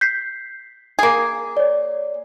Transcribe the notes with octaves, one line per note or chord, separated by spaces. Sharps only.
G6 B6 C7
A#3 G#4
C#5 D5